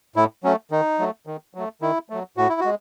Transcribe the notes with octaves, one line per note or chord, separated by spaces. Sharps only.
A2 E4
F#3 A3 C#4
D#3 D#4
F#3 A3
D#3
F#3 A3
D#3 E4
F#3 A3
A2 F#4
E4
G#3 F#4